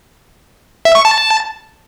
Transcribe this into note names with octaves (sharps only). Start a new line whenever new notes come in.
E5
C#6
A5